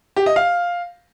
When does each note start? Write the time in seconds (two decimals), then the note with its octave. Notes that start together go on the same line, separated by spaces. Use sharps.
0.16 G4
0.26 D#5
0.36 F5